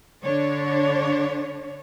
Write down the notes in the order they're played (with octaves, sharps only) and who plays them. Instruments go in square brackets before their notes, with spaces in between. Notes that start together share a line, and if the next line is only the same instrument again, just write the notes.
[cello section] D3 D4 C#5